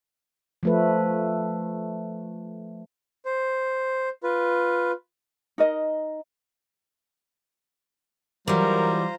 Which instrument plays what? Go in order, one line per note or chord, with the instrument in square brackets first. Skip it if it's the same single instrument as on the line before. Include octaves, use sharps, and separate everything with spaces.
[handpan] F3 A3 B4
[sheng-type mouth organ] C5
F4 B4
[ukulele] D#4 A#4 D#5
[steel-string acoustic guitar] E3 F#3 [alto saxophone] G3 [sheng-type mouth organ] F4 C5 A#5 [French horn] A#4